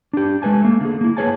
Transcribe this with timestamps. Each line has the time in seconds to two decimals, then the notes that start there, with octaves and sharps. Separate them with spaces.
0.13 D4 G4
0.42 G#3 A3 B4 G#5 A5
0.62 A3 A#3
0.81 D3 A#3 G#4
1.01 A#3 E4
1.17 A#3 G#4 B4 C#5 G#5 A5